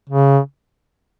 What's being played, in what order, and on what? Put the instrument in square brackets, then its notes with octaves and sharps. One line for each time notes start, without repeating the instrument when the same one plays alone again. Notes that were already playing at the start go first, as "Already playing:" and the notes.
[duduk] C#3